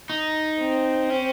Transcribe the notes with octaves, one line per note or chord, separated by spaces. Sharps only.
D#4
C4
C#4